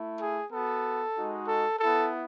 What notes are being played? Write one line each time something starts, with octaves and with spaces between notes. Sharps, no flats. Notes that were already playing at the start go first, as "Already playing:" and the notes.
Already playing: A3 E4
G#4
B3 F#4 A4
G#3 D#4 F#4
A4
B3 E4 A4